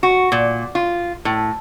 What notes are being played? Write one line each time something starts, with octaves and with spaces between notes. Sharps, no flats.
F#4
A#2
F4
A2